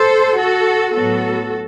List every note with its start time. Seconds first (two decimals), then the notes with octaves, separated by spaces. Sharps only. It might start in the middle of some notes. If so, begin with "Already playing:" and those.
Already playing: A4 C5
0.38 F#4 A4
0.94 A2 F#3 B3 F#4 A4